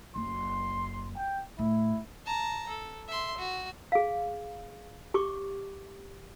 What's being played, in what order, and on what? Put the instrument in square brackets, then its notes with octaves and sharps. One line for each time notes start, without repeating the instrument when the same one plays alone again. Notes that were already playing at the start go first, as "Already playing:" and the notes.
[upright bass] F#1 [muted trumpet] C6
[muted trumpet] G5
[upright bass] A2 [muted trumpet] E4
[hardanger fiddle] A5 A#5
A4
E5 C6
F#4
[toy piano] G#4 F5
G4 C#6 D6